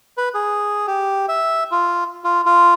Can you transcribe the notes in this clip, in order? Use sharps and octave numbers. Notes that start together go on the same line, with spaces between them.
B4
G#4
G4
E5
F4
F4
F4